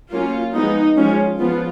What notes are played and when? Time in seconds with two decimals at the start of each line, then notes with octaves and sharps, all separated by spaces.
0.12 F#3 A#3 C#4 F4
0.54 F3 G#3 B3 D#4
0.96 F3 G#3 C#4 F4
1.39 F3 B3 F4